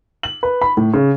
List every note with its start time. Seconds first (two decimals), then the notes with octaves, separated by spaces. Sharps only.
0.23 F#7
0.43 B4
0.62 B5
0.77 A2
0.94 C#3